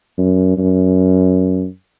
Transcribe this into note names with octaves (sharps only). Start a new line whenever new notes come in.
F#2
F#2